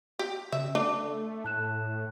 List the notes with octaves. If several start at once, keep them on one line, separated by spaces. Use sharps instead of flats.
G4
C#3 E5
A3 D4 D6
A2 A5 F#6 E7